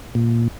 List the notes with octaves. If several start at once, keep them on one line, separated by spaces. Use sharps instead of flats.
A#2